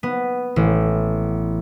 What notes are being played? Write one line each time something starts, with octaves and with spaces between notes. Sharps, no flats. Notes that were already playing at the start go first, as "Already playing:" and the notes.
B3
A1